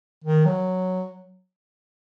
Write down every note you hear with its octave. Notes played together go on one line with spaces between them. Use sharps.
D#3
F#3